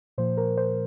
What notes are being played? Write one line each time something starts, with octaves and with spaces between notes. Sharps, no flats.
A#2 F3 A#3 C5
A#4
C5